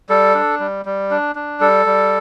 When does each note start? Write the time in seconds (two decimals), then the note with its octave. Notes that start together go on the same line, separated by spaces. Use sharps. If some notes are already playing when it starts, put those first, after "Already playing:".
0.09 G3 A4
0.35 D4
0.60 G3
0.85 G3
1.11 D4
1.35 D4
1.60 G3 A4
1.86 G3